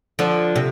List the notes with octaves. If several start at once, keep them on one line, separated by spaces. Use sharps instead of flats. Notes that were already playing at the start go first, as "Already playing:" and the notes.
D3 F3
C3